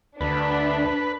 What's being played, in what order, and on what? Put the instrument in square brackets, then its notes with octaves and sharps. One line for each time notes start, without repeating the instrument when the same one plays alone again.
[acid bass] D2 [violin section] D4 [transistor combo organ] B4